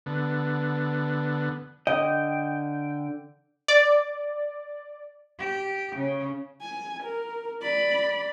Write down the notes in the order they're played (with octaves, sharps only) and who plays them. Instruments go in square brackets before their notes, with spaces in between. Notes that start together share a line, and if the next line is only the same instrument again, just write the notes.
[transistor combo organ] D3 B3
[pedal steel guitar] D3 G5 [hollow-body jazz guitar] D#5
[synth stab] D5
[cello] G4
C#3
[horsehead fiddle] G#5
A#4
D5 B5